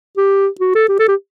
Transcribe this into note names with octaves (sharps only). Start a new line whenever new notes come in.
G4
F#4
A4
G4
A4
G4